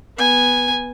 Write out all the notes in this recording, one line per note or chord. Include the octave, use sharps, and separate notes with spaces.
B3 G#5